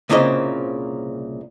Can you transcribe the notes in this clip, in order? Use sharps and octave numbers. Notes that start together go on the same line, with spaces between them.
C2 A#2 C#3 A#3 C4 D#5